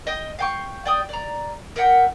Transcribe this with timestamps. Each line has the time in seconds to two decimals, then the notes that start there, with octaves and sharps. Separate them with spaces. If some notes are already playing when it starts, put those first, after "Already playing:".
0.07 D#5 G5
0.39 F5 G5 C#6
0.85 D5 G5 D#6
1.09 D5 A#5
1.76 A#4 E5 F#5 G5